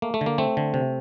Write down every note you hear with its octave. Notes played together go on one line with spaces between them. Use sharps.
A3 A#3
A3
D3
A#3
A3 C4
D3
C3